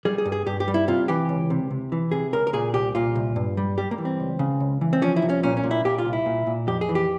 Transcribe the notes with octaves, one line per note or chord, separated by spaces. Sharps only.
G3 G#4
G#4
G2
G#4
G2 G4
G4
G3
E4
C3 F4
E3 G4
C#2
C3
C3
E3
C3 G#4
C#2 A#4
A#4
A#2 G#4
C2 G4
A#2 F4
C2
G2
G3
G3 G4
A#3
E3
C4
C#2
C#3
C#2
E3
C4
F3 C#4
E4
C2
C#4
A#2 C#4
C#4
A#2
E4
A#2 G4
F4
C2
E4
A#2
A#2
F2 G4
G#4
E3
G4